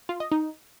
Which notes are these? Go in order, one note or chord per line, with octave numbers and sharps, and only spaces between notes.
F4
D#5
D#4